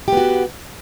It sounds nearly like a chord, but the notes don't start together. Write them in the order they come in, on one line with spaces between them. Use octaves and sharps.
G4 B3 F#4